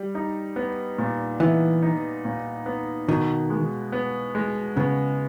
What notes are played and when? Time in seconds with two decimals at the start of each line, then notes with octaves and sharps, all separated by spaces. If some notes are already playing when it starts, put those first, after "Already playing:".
Already playing: G3
0.15 D#4
0.56 B3
0.98 A#2
1.40 E3 B3
1.82 D#4
2.25 A#2
2.66 B3
3.08 B2 D#3
3.50 G#3
3.92 B3
4.35 G#3
4.77 C#3 B3